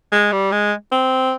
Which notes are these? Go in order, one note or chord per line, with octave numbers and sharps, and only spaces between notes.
G#3
G3
G#3
C4